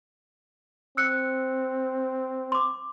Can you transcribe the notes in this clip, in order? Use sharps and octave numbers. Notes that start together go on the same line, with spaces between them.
C4 E6 F#6 C#7
C6 D6